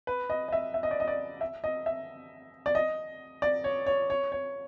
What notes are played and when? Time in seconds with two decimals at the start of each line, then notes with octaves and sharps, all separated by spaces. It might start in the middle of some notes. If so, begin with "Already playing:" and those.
0.07 B4
0.30 D#5
0.48 D#5
0.52 E5
0.74 E5
0.83 D#5
0.91 D5
1.00 D#5
1.08 D5
1.41 E5
1.64 D#5
1.86 E5
2.66 D5
2.75 D#5
3.42 D5
3.64 C#5
3.86 C#5
4.10 C#5
4.32 C#5